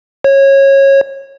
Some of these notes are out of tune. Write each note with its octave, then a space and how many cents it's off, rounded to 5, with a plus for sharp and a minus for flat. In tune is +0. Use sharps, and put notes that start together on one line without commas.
C#5 -20